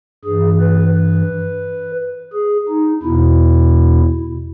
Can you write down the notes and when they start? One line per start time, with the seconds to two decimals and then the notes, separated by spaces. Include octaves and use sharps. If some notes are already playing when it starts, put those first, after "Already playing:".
0.25 G2 E3 G#4
0.60 B4
0.94 B4
2.33 G#4
2.69 D#4
3.03 E2 B2 E4